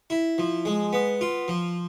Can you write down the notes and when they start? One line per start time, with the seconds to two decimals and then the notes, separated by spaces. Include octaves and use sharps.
0.10 E4
0.38 F3
0.65 G#3
0.93 B3
1.21 F4
1.48 F3